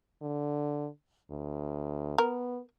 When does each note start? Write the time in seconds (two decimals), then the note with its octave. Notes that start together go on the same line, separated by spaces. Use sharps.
0.22 D3
1.30 D2
2.18 B3 A#4